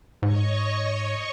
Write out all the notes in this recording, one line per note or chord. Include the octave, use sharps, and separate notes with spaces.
G#2 C#5 D#5 C#6